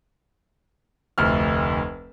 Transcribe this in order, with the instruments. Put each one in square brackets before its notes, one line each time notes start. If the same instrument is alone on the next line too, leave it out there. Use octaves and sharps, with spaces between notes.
[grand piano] F1 D2 F6